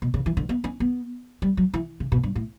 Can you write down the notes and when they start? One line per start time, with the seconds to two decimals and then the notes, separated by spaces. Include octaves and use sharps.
0.02 B2
0.14 C#3
0.26 E3
0.37 D3
0.49 B3
0.64 C#4
0.80 B3
1.42 G3
1.57 F#3
1.74 E3
2.00 C#3
2.12 B2
2.24 G2
2.36 A2